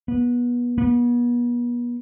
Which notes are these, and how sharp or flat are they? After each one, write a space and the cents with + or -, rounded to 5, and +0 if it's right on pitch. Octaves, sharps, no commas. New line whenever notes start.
B3 -25
B3 -40